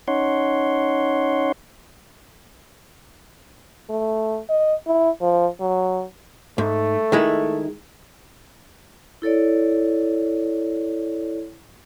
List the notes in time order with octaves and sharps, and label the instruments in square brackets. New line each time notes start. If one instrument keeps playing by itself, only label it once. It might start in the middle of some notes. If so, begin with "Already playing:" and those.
[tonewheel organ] C#4 D#4 C#5 F#5 C6
[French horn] A3
D#5
E4
F3
F#3
[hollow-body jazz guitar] G#2 [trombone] A3
[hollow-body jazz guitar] D#3 G#3 E4
[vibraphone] E4 A4 C#5 D5